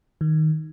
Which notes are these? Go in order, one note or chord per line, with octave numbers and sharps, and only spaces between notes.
D#3